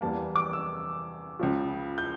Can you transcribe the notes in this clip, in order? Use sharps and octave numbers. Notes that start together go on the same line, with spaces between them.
E2 E3 G3 A#3 A5
D6
E6
C#2 C#3 F3
G6